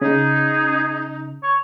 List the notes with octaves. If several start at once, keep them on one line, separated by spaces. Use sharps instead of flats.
C#3 D#4 G#4
C#5